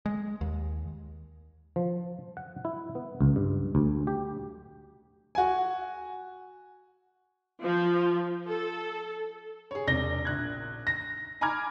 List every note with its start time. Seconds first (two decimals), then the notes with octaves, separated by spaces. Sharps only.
0.06 G#3
0.41 D#2
1.76 F3
2.37 F#5
2.65 E4
2.95 B3
3.21 C#2
3.36 G2
3.75 D2
4.07 G4
5.35 F#4 G#5
7.63 F3
8.47 A4
9.71 G#4 C#5
9.87 E1 C3 D5 A#6 G7
10.25 A#1 F#6 G#6
10.87 A#6
11.41 G#5 A#5 B5 D6 F6 G#6